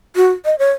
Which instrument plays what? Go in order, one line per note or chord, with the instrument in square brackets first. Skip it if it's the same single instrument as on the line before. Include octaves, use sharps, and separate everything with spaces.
[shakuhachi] F#4
D#5
C#5